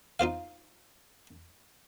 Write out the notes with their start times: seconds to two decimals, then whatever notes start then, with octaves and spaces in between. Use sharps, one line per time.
0.20 D#4 F4 C5 F5